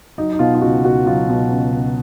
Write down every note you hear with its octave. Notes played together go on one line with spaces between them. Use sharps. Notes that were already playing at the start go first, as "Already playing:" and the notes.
F#3 D#4
D#4
B2 F4
F4
C#2 F#4
C#2 F#4
F#3 F4
B2
C#2
C#2